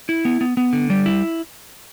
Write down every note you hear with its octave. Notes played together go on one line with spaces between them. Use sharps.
E4
B3
B3
B3
D3
G3
E4